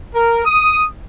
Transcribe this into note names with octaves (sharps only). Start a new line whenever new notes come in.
A#4
D#6